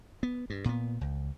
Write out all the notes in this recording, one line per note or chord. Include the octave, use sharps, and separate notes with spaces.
B3
G2
A#2 B3
C#2